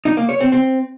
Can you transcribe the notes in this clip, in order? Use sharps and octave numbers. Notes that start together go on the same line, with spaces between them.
D#4
A#3
C#5
C4
C4